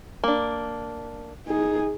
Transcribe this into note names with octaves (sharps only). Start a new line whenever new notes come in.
A#3 D4
D#4 G#4